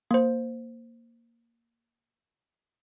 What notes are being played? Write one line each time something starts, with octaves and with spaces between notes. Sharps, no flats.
A#3 C5